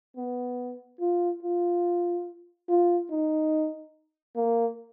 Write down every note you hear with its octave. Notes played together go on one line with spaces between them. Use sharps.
B3
F4
F4
F4
D#4
A#3